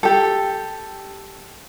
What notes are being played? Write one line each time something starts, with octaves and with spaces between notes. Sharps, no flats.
G4 A4